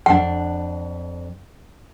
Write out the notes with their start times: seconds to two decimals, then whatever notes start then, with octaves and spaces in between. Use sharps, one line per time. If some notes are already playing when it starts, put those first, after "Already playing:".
0.06 F2 D4 F#5